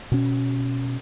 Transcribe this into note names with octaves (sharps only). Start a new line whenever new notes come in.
B2 C#4